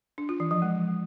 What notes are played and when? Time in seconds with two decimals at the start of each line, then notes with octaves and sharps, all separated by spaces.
0.18 D4
0.29 F4
0.40 E3
0.51 F3
0.62 G#3